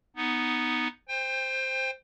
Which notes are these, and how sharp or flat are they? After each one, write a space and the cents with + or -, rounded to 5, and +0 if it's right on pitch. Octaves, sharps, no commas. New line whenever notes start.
B3 +0 D#4 +0
C5 +0 G5 +30